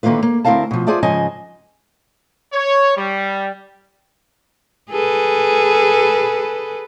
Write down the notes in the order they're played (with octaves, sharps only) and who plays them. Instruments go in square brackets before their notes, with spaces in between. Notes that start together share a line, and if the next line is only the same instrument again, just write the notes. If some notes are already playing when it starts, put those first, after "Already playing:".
[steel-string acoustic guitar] D3 D#3 A#3 E4 F4 B4
A#3
D2 C4 E4 A#4 F5 A5
B2 F3
F4 G#4 C5 D5 E5 A5
G#2 C#3 F3 D#5 G#5 A5
[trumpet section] C#5
G3
[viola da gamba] G#4 A4 B4